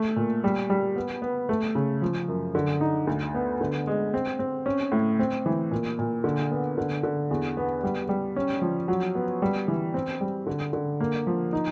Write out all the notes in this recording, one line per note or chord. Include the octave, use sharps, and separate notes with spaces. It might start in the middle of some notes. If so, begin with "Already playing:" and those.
Already playing: A3
A#2
G3
G3
B3
B3
A3
C#3
F3
F#2
D3
D#4
D2
B3
D3
G#3
C4
C4
C#4
A2
C4
E3
A#2
A#2
D3
B3
D3
D3
E2
B3
G3
G3
C#4
F3
F#3
B3
G3
E3
C4
G3
D3
D3
A#3
F3
D#4